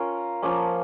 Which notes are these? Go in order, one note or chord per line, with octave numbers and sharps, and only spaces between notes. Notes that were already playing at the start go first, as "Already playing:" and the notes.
Already playing: C#4 F4 A#4
F3 A#3 C#4